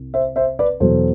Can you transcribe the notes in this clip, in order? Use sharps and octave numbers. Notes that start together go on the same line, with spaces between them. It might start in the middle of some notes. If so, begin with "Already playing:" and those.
Already playing: C2
C5 E5
C5 E5
B4 D5
E2 B2 F#3 A4 C5